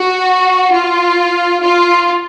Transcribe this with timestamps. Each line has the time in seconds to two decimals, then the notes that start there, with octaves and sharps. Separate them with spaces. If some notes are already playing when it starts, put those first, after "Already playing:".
Already playing: F#4
0.72 F4
1.64 F4